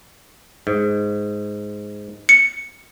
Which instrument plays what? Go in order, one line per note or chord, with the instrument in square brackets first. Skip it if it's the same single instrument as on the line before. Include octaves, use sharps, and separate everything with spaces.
[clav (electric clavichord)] G#2
[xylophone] C#7